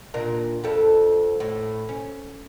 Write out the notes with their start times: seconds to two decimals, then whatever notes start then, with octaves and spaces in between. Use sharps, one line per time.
0.14 A#2 D4 A#4
0.64 F2 G3 A4
1.40 A2
1.89 C#4